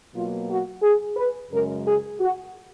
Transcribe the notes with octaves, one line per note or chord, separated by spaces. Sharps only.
B2 F#3 A#3 F4
F#4
G#4
B4
F#2 C#3 G#3 A#4
G#4
F#4